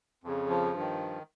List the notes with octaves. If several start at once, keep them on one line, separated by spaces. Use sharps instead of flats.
F2 C#3
F3
G2
D#3